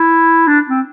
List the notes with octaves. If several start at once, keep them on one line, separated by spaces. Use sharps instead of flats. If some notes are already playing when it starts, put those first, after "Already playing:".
Already playing: E4
D4
C4